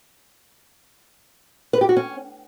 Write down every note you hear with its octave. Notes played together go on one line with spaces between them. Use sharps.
B4
G4
F#4
C#4